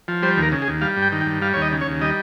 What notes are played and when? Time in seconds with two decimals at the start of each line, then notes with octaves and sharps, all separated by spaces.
0.08 F3
0.22 G3 C5
0.37 D#2
0.43 A#4
0.52 C#3
0.62 G#4
0.68 D#2
0.81 G3 F5
0.96 G2
1.02 G5
1.12 D#3
1.21 G5
1.26 G2
1.42 G3 F5
1.54 D#2 C#5
1.62 D#5
1.72 C#3
1.81 C#5
1.87 D#2
2.01 G3 D#5